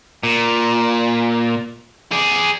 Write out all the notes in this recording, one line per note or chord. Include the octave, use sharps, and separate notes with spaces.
A#2
G#4 D5